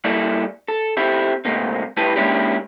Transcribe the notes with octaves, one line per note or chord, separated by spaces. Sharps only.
G3 A#3 E4 A4 D5
A4
C4 E4 G4 A4
G#2 C3 A3 A#3 C4
C2 A2 E4 G4 B4 A5
G#3 A#3 C#4 D4 E4 G4